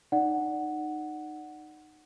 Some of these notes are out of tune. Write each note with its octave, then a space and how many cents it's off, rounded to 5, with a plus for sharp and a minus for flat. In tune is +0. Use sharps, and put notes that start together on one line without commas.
D#4 -20 D5 +0 F#5 +0